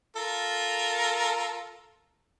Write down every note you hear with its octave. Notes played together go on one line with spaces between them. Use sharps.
F4 A4 A#4